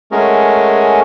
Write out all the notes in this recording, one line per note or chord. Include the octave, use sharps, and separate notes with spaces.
G#3 A3 C#4 F#4 G#4 A#4